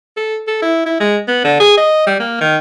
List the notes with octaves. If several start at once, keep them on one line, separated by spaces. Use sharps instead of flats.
A4
A4
E4
E4
G#3
B3
D3
G#4
D#5
G3
A#3
D#3